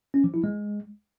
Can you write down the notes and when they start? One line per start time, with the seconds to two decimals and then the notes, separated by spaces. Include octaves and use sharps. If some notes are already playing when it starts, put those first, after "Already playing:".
0.14 C#4
0.24 F3
0.34 E4
0.44 G#3